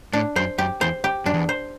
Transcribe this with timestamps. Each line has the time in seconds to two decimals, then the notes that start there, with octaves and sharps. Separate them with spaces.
0.13 A2 D4
0.36 F#2 C5
0.58 F#2 G4
0.81 E2 C5
1.04 G4
1.25 F#2 D4
1.34 E2
1.49 C5